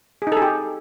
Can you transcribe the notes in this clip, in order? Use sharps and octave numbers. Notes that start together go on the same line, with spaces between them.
G#4
D#4
A4
G#4
G4